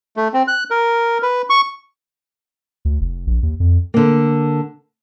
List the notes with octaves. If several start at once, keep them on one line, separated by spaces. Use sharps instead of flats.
A3
C4
F#6
A#4
B4
C#6
D2
F1
A#1
D#2
F2
D3 A#3